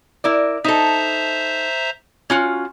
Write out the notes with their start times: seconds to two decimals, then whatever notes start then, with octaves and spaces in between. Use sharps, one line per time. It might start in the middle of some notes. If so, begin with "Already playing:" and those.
0.24 E4 A#4 D5
0.64 D#4 A4 C5 E5 A#5
2.30 C#4 F4 F#4